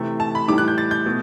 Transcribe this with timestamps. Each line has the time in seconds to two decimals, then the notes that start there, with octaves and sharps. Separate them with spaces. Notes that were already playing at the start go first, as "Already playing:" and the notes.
Already playing: C3 E3 A3
0.20 A5
0.35 B5
0.48 A2 E3 G3 D6
0.58 F#6
0.68 G6
0.78 A6
0.91 G6
1.06 B2 A3